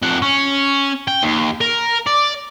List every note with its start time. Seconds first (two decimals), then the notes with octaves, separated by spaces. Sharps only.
0.02 F2 F#5
0.22 C#4
1.08 G5
1.23 D#2
1.61 A#4
2.07 D5